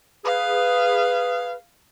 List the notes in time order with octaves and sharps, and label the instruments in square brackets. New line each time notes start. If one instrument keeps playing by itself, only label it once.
[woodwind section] G#4 B4 [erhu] F5